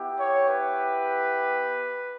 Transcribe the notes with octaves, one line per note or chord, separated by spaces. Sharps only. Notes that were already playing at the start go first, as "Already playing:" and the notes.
Already playing: B3 E4 G4
C#5
B4